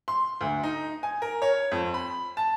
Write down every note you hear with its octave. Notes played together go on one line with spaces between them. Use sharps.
C6
D2
D#4
G#5
A#4
C#5
F2
B5
A5